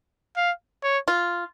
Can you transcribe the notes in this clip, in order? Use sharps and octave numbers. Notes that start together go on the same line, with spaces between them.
F5
C#5
F4